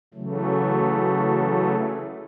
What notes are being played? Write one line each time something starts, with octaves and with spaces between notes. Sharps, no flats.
C#3 E3 F#3 A3